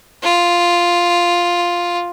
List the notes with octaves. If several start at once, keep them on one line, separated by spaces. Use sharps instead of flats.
F4